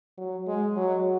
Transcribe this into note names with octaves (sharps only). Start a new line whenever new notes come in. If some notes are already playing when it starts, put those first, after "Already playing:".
F#3
G#3
F#3